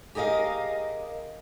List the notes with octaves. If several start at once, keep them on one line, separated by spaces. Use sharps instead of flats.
G4 G#4 A#4 D#5 F5